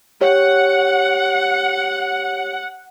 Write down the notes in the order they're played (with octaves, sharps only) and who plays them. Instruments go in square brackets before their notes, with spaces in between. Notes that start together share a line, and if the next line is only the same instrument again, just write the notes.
[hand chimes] G4 C#5 [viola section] F#5